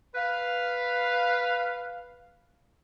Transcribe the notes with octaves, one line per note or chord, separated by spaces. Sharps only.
B4 F5